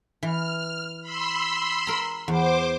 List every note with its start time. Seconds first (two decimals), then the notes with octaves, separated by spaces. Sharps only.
0.23 E3 F6
1.02 B5 C6 E6
1.87 A#4 A#5
2.28 E2 C5 D6